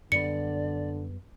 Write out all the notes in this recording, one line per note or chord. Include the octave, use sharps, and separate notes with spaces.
F#2 D3 G3 B3 D5 C#7